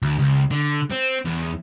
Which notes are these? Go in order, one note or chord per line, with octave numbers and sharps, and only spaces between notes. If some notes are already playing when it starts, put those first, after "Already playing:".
D2
C#2
D3
C4
E2